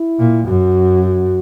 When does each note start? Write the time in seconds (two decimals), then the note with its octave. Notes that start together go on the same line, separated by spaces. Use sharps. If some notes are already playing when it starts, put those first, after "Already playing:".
Already playing: E4
0.19 A#2
0.48 F#2 F#4
1.06 F#4